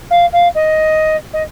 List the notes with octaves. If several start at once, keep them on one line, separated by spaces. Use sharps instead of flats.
F5
F5
D#5
D#5